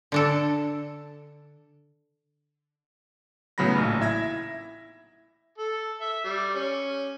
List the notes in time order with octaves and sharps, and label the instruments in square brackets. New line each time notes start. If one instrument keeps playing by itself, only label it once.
[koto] D3 D4 A4
[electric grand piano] A2 C#3 F#3 B3 B5 A#6
A1 A#2 D#4
E4 E5 G#6 A#6
[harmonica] A4
E5
G3
C#4